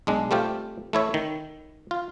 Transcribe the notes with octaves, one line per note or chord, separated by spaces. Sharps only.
B1 G#3 D4
G3 A3 C4 F4 G4
A3 E4 C#5 E5
D#3
F4